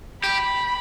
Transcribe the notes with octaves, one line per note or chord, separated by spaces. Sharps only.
G4 B5